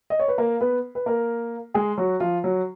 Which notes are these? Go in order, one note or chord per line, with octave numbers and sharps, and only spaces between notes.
D#5
C#5
B4
A#3 A#4
B3 B4
B4
A#3 A#4
G#3 G#4
F#3 F#4
F3 F4
F#3 F#4